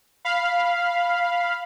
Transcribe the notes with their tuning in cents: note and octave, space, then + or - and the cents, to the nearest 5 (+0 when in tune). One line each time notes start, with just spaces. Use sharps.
F5 +0 B5 +0